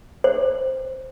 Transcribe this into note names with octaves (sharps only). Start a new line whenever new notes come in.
C5